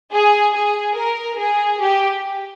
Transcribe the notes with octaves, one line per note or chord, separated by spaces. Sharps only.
G#4
G#4
A#4
G#4
G4